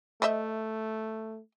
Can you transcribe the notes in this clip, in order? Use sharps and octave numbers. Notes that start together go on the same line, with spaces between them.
A3 C5 D#5 E5